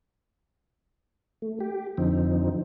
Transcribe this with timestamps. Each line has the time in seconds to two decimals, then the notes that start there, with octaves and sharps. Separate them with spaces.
1.42 A3
1.60 G4
1.98 F2 D3 F3 C4 D#4